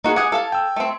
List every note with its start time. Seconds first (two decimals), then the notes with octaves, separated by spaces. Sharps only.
0.04 A#3 D#4 F#4 G#4
0.16 G#4 F#5 D6 G#6
0.32 A4 F5 A5
0.52 G5 E6
0.76 A3 C4